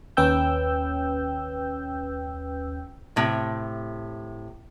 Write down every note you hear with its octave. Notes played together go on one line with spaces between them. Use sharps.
D#2 C#4 B4 G5 E6 G6
A2 C3